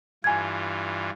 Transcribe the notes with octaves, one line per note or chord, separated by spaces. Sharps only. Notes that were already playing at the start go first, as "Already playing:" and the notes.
G2 E3 F4 G#5 G#6